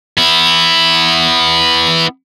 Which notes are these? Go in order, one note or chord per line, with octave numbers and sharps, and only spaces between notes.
B3 E4